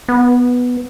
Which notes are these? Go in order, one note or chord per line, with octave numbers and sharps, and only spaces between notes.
B3